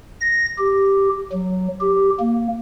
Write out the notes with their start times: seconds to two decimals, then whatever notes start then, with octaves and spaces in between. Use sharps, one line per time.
0.21 A#6
0.58 G4
1.32 F#3
1.81 G4
2.20 A#3